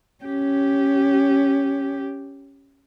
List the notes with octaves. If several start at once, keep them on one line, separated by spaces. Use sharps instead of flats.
C#4 G4